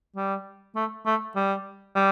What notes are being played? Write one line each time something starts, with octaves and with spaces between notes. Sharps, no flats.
G3
A3
A3
G3
G3